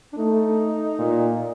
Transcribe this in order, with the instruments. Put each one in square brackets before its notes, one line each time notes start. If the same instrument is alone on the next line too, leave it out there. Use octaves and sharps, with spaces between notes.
[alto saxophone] D4
[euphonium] A3 [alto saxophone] D#4
[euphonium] A#2